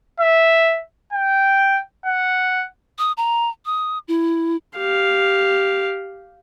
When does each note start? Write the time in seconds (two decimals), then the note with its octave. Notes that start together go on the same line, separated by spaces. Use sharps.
0.20 E5
1.13 G5
2.05 F#5
2.99 D#6
3.17 A#5
3.65 D#6
4.08 E4
4.78 G4 F5